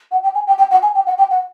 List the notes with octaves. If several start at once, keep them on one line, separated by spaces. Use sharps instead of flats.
F#5
G5
G#5
G5
G5
F#5
G#5
G5
F#5
G5
F#5